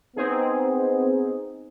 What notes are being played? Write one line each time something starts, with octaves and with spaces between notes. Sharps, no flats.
B3 C4 D#4 G#4